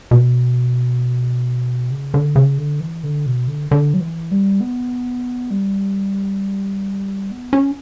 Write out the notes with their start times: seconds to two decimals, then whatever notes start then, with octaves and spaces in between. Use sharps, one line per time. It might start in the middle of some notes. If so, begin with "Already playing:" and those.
0.11 B2
1.91 C#3
2.14 D3
2.36 C#3
2.58 D3
2.80 E3
3.03 D3
3.26 B2
3.48 D3
3.71 D3
3.94 F#3
4.00 E3
4.31 G3
4.61 B3
5.51 G3
7.31 B3
7.53 C#4